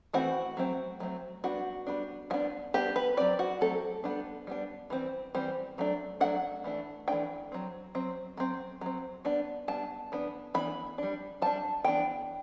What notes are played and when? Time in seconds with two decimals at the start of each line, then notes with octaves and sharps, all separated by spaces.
0.13 E3 A3 C4 F#4
0.57 F#3 A3 C4
1.00 F#3 A3 C4
1.44 G3 B3 D4 F#4
1.87 G3 B3 D4
2.30 G3 B3 D4 F#4
2.74 G3 B3 D4 G4
2.96 B4
3.17 F#3 A3 C4 D5
3.39 F#4
3.61 F#3 A3 C4 A4
4.04 G3 B3 D4
4.47 G3 B3 D4
4.90 E3 G3 C4
5.35 E3 G3 C4
5.78 F#3 A3 D4
6.21 F#3 A3 D4 F#5
6.64 E3 A3 D4
7.08 E3 A3 D4 G5
7.52 F#3 C4
7.95 F#3 C4
8.37 F#3 C4
8.81 F#3 C4
9.25 G3 B3 D4
9.68 G3 B3 D4 A5
10.12 E3 B3 D4
10.54 E3 B3 D4 B5
10.98 G3 D4
11.42 G3 D4 A5
11.84 E3 B3 D4 G5